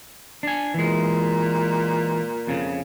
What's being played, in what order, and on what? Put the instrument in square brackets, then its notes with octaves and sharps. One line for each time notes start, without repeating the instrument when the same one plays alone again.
[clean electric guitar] D4 G#5
[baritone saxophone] A#2 [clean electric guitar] E3 G#3
[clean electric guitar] F2 C#3